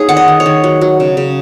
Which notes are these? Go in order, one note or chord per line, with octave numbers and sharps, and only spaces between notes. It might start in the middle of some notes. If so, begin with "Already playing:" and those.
Already playing: A#3 D#4 G#4 C#5
D#3 F#5
D#5
D#3
C#5
D#3
F#3
F#3
C#3
C#3